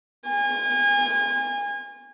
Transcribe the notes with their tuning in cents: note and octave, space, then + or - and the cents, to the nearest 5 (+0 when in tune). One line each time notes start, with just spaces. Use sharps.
G#5 -35